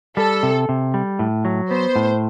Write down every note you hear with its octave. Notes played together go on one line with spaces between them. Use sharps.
G3 A4
C3
C3
G3
A2
F#3
B3 C5
A2